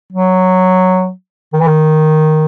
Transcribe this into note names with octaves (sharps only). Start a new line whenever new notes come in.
F#3
D#3
E3
D#3